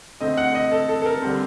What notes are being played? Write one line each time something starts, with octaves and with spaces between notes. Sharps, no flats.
D3 A3 C4 D#5
F#5
D#5
A4
A4
A4
A#4
D3 G3 C4